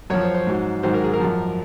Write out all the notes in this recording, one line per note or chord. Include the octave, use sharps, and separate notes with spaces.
F#2 F3 C#5
C5
C5
G#2 F#3
G#2 D#3 F#3 C5
A#4
G#4
A#4
F#2 F3